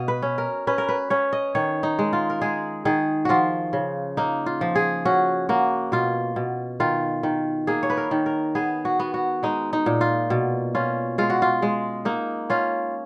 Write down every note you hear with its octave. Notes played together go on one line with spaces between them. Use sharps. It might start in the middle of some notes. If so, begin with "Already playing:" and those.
Already playing: B2 D#5 F5
B4
C#4
A#4
C#4 B4
A#4
B4
C#4 C#5
D#5
D#3 C#5
D#4
G#3
F4
A#4
G#3 G#4
D#3 G#4
F3 F4 F#4
C#3
A#3 D#4
F4
F3
G#4
C#4 F#4
A#3 F#4
B2 F4
B2
D#3 F4
D#3
A#3 G#4
C#5
B4
A#4
D#3
A#4
B3 G#4
F#4
B3
F#4
G#3 D#4
D#4
A#2
F4
B2
C#4 F4
G#3 F4
F#4
F4
G#3
A#3 D#4
C#4 F4